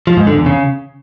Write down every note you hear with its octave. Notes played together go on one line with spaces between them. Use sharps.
F3
G#2
D3
E2
C#3